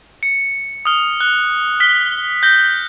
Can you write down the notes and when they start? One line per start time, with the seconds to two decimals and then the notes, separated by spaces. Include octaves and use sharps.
0.23 C#7
0.85 D#6 F6
1.21 F#6
1.80 F6 B6 G7
2.43 G6 A#6 G7